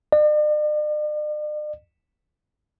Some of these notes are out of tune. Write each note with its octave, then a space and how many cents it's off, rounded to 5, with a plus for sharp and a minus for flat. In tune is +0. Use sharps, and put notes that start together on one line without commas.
D5 +45